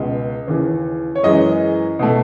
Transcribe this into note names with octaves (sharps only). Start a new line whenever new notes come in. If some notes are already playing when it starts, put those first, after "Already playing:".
Already playing: C#2 B2 G#3
D#2 C#3 E3
C#5
F#2 E3 G#3 D#5
B2 A3